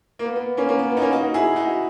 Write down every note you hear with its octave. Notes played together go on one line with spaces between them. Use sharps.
A#3
B3
B3
A#3 C#4
A#3 C#4
B3
B3
D#4
A#3 C#4
D#4 F#4
E4 G#4
D#4 F#4